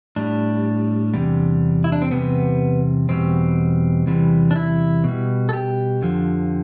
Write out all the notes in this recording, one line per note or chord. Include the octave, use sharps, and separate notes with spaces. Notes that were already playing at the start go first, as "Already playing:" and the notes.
A2 G3 D4
E2 C3 G3
E4
D4
C4
E2 C3 G3 B3
E2 B2 G3 C4
E2 C3 E3 G3
D4
E4
B2 G3
A4
G4
F2 D3 F3